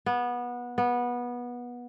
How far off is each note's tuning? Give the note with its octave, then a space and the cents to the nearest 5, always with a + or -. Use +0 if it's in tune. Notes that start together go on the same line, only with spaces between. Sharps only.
B3 -20
B3 -20